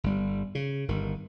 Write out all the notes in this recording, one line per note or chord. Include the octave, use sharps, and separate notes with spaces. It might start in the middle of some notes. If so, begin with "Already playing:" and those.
G1 G3
C#3
G1 D#3